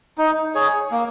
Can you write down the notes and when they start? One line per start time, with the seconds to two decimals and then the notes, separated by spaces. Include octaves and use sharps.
0.18 D#4
0.55 G#4 C#5
0.91 A#3